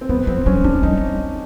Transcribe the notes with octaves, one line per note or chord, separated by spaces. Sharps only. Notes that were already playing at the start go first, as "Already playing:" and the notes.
C4
F3 B3
F3 C4
F#3 C#4
G3 D4
G3 D#4